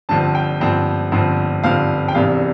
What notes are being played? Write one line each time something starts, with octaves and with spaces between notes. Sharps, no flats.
G1 G2 F3 C4 A5
G5
G1 G2 F3 C4
G1 G2 F3 C4
G1 G2 F3 C4 F5
G5
E1 E2 C3 G3 F5